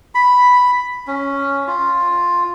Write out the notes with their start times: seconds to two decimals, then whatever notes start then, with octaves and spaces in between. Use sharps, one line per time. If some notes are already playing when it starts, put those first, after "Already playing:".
0.15 B5
1.07 C#4
1.67 F4